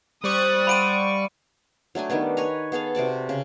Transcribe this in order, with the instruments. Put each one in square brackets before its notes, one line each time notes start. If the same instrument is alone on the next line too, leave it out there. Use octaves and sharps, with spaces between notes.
[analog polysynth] G3 D5 C#6 [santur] C5 [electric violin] D#6 F#6
[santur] F5 F#5 C6 [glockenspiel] B5 D7 D#7
[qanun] F#3 A3 D4 G#5
D#3 G3 B3 D4
B4 C#5 G#5 A#5
B3 G#4 A4 F5
C3 F#4 D5 A5
C#3